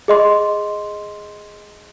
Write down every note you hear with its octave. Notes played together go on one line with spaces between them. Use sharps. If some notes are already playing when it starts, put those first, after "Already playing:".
G#4 D#5 C6